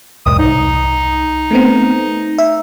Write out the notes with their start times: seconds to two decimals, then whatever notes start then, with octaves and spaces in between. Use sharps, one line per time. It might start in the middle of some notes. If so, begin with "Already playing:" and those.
0.26 B1 E2 G#2 D#6
0.39 C2 D#4
1.51 A3 B3 C4
2.38 E5